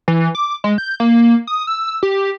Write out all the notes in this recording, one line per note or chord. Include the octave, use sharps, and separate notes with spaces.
E3
D6
G#3
G6
A#3
D#6
E6
G4